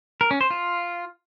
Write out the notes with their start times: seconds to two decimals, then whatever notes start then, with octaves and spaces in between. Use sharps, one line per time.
0.21 A#4
0.31 C#4
0.41 C5
0.50 F4